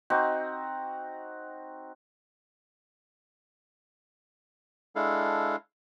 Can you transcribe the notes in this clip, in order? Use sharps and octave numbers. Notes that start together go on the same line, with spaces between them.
C4 D#4 F#4
G#3 D4 E4 A4 F5